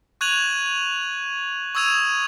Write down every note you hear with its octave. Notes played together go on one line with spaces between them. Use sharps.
C#6 F#6 G#6 D#7 F7 F#7
C#6 D#6 E6 G#6 D#7 F7